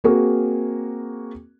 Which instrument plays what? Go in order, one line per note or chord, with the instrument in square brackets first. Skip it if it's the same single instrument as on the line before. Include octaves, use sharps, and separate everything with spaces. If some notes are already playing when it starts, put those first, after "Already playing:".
[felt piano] A#3 C4 F#4 G#4 A#4